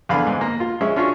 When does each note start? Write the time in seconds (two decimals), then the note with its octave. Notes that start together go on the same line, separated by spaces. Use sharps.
0.09 E2 D3 F5 B5
0.27 G#2
0.41 A#3
0.60 F4
0.81 G#3 C#4 E5
0.96 C#4 D4 F4 F#4